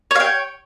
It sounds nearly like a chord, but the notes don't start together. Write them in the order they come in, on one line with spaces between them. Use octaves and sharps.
C#5 F5 G5